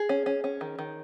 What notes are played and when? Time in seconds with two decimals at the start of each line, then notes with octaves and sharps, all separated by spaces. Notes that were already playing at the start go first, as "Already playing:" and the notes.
Already playing: G#4
0.09 C#4
0.26 C#4
0.44 C#4
0.61 D#3
0.79 D#3